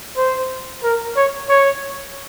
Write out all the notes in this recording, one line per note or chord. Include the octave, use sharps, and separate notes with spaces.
C5
A#4
C#5
C#5